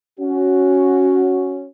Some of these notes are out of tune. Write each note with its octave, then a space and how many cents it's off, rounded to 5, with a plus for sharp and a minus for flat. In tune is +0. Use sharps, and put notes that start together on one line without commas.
C#4 +0 F#4 +0